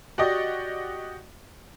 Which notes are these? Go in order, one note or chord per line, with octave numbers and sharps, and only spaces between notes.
F#4 G4 D5 D#5